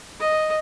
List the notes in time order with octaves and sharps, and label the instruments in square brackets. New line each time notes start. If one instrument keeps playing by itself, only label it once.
[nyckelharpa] D#5